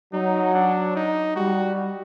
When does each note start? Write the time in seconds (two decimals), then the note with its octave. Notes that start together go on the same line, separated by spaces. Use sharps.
0.13 F#3 D#4
0.54 D4
0.95 D#4
1.36 G3 F#4